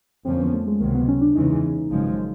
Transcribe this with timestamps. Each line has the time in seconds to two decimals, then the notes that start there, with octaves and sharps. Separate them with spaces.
0.25 F2 D3 F3 A#3 C4 C#4
0.39 B3
0.53 A3
0.67 G#3
0.80 C#2 C3 D#3 F#3 A#3
0.94 B3
1.08 C#4
1.21 D4
1.35 E2 C#3 E3 G#3 C#4 D#4
1.90 G#1 F#2 C#3 F3 G#3